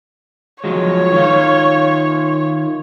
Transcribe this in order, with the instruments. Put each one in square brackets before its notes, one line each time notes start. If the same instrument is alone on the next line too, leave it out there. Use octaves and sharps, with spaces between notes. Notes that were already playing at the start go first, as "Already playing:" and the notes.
[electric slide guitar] F3 F#3 G#3 [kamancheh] C#5
[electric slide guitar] D#3 F4